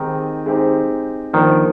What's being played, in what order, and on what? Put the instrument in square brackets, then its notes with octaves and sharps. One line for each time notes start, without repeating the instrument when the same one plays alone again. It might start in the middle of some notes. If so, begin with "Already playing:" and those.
Already playing: [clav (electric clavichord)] D#3 [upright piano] G#3 C4 D#4 G4
[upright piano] G#3 C4 D#4 G4
[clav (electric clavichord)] D#3 [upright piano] F3 A#3 D4